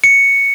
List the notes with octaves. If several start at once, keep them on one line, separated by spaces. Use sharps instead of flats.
C#7